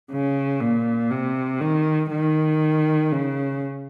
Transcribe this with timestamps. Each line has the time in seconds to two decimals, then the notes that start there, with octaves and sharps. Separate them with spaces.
0.12 C#3
0.61 A#2
1.11 C3
1.61 D#3
2.11 D#3
3.12 C#3